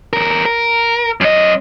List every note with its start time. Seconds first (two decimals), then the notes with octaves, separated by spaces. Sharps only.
0.13 E2 A#4
0.45 A#4
1.21 F#2 D#5